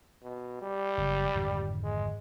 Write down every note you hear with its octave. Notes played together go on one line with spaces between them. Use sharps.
B2
G3
F#1
G#1 F2 D3
G#3